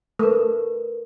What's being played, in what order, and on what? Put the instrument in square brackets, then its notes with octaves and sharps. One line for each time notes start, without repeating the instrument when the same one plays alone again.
[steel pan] A3 [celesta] A#4 B4